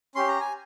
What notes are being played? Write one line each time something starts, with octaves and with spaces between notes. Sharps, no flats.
C#4 G4 C6
A#5
G#5